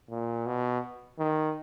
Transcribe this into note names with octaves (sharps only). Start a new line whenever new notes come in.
A#2
B2
D#3